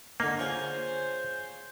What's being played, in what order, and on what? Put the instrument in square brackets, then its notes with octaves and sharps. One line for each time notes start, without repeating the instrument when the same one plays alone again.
[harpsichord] D3 D#4 [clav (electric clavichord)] A#3
[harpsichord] C#4 F4 G#4 [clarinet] C5